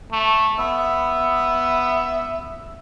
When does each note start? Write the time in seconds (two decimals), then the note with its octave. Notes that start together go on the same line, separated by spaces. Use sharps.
0.12 A3
0.59 B3 E5